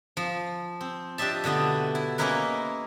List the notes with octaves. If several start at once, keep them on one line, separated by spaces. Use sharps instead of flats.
F3
C4
D4 G4 D#5 E5 A5
B2 D3 A3 B3
E4
A#3 C#4 D#4 E4 A#4 B4